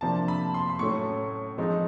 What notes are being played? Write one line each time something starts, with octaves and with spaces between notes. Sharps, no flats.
C3 F3 A#3 D4 A5
B5
C6
C6
A2 F#3 A3 C#4 C#6
F3 G#3 C4 D#4